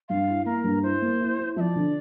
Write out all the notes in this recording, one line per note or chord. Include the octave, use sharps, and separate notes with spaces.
G2 F5
E4
A#3 A#4
G2
E4 C5
A#3
E4
E4
F3 D5 E5
D3